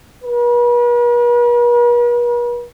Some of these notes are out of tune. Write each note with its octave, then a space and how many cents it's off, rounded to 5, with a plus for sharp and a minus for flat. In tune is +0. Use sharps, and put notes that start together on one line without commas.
B4 -45